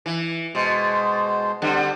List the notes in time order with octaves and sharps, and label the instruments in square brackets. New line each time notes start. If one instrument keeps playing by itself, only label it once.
[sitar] E3
[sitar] B2 [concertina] G#3 C5
[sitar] D3 G3 [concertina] C4 F#5